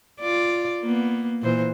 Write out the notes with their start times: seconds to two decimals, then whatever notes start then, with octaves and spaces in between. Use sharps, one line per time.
0.20 F4 D5
0.81 A#3 B3
1.42 A#2 E3 C5